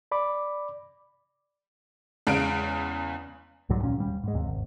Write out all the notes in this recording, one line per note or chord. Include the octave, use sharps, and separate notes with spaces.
D5 B5 D6
E2 C#3 G#3 F5 D7
C2 G#2 F#3 G3
D#2 A#2 C#4
D#1 G3
G#2 G#3
D#2 C3
G#1